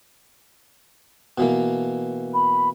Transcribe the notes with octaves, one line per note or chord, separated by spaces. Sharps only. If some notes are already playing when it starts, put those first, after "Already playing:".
B2 E3 A#3
B5